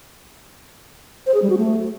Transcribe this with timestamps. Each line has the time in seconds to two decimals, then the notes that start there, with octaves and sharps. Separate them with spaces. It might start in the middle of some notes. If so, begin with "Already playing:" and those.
1.26 C5
1.34 G#4
1.42 G3
1.50 F#4
1.58 A3